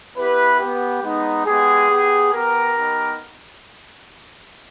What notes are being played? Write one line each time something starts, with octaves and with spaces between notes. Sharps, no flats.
B3 E4 G4 B4
B3 G4
G#3 B3 D#4
G#3 B3 G4 G#4
B3 G4
B3 G4 A#4
B3 D#4 G4